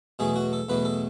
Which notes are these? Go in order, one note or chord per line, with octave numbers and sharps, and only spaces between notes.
E2 B2 F#3 A3 G#4
F#4
A4
E2 B2 F#3 A3 B4
A4